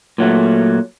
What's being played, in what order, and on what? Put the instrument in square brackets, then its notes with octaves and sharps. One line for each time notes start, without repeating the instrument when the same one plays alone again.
[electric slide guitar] A#2 F#3 A3